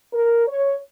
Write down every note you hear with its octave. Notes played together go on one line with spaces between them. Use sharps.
A#4
C#5